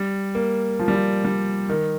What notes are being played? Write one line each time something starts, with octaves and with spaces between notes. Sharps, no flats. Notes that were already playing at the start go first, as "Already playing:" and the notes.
Already playing: G3
A#3
F3
G3
F3
G3
D#3